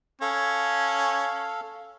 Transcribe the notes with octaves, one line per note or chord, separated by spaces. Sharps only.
C#4 A4 F5